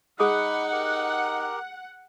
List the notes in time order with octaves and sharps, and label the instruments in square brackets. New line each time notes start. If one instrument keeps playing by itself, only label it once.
[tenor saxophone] D#4 [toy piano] G#4 D#6 [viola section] F#5 [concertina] B5 D6
[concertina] G4 A#4